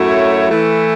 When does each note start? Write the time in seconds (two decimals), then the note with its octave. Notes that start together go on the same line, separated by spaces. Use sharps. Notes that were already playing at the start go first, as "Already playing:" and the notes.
Already playing: F#2 F#3 A3 E4 C#5
0.50 E3 A3 E4